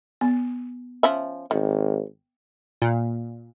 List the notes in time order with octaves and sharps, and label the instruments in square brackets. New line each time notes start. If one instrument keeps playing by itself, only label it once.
[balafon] B3
[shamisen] F3 C#4 E5
[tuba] G#1 [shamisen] D#3
[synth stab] A#2